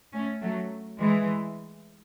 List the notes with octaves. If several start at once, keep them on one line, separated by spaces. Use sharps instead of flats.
A3 C#4
F#3 A3
E3 G#3